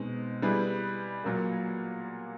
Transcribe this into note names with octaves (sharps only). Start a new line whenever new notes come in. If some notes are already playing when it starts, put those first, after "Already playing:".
Already playing: B2 G#3 C4 D#4
G3 B3 E4 G#4 B4
A#2 F#3 A#3